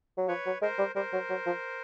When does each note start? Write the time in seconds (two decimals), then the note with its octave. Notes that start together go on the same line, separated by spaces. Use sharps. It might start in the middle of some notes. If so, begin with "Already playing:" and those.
0.18 F#3
0.28 F3 B4 C#5
0.46 F#3
0.62 G#3 A#4 C5
0.79 G3
0.95 G3 A#4 C5
1.13 F#3
1.30 F#3
1.46 F3